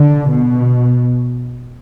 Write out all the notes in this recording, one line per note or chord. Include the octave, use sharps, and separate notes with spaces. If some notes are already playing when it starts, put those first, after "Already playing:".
Already playing: D3
B2